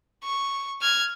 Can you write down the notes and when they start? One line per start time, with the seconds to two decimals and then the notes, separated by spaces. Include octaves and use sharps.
0.23 C#6
0.82 F6 G#6